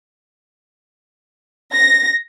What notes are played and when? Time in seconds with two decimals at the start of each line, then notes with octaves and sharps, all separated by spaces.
1.74 A#6